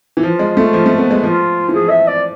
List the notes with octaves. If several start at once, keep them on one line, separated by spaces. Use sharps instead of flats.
E3
F3 F4
G#3
A3
F3
A3
B3
G#3
F3 F4
E3
F3 G#4
E5
D5